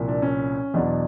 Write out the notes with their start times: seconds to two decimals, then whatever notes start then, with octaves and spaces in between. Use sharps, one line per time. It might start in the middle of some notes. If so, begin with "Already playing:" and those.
Already playing: C2 A#2 F3
0.08 D4
0.22 C#4
0.74 E2 B2 F#3 D4